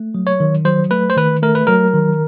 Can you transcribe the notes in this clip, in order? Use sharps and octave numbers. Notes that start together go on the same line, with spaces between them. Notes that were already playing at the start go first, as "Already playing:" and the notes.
Already playing: A3
F#3
C#5
D#3
F#3 C5
A3 B4
C5
D#3 B4
A3 A#4
B4
F#3 A#4
D#3